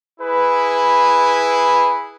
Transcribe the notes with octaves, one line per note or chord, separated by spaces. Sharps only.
E4 G#4 B4